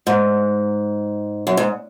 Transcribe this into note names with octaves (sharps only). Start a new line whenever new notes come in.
G#2
F#2
G#2